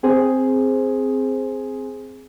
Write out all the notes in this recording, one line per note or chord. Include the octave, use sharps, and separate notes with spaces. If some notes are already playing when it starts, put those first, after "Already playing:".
C4 G#4 C5